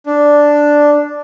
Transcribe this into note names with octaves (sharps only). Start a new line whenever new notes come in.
D4